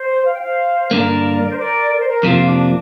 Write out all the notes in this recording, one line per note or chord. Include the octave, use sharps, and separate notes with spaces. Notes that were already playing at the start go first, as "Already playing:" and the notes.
Already playing: C5
F5
G5
C5 F5
G2 D3 A#3 A#4 D5
C5
A#4 D5
A#4
C5
A#4
F2 C3 F3 A#3 F4
D4